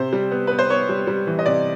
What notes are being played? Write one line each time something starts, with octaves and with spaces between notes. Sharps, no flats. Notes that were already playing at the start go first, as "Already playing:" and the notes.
Already playing: C3 C5
G3
B3
B3 B4
C5
B3 C#5
G3
G3
E3
D#5
C3 D5